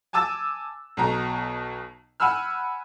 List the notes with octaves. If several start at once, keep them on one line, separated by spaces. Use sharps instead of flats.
G#5 A5 D6 E6 A6
B1 B2 A#5
F#5 G#5 B5 E6 F6